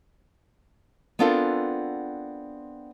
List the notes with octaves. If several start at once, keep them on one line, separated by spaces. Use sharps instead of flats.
B3 C4 D4 F4 A4 A#4